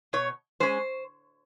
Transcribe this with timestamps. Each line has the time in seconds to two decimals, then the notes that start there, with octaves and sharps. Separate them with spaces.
0.13 B2 C#5
0.60 G#3 C#4 C5